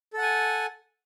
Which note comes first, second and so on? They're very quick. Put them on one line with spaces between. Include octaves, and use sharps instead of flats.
A4 F#5 G#5